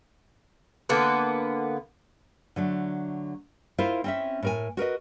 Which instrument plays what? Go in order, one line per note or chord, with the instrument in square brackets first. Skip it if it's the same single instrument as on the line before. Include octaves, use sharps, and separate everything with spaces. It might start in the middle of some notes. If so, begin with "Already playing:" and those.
[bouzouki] D3 A#3 B3 B4
[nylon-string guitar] D3 F#3 A3
E4 F4 A#4 C5 F5
C4 C#4 E5
A2 A#4 G#5
F#4 A#4 B4 D#5